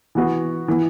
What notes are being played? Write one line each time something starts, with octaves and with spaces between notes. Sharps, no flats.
E3 B3 F#4
E3 B3